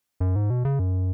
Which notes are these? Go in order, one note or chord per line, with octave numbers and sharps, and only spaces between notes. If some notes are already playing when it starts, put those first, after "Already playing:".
F#2
G#2
B2
C#3
F#2